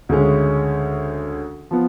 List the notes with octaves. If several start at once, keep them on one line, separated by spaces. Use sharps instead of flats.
D2 C#3 G#3 C#4
F3 B3